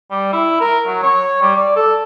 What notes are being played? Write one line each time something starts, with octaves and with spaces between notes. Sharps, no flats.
G3
E4
A#4
F#3
C#5
G3
D5
A4